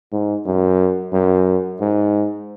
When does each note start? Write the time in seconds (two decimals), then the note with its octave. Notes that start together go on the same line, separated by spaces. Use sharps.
0.13 G#2
0.46 F#2
1.13 F#2
1.81 G#2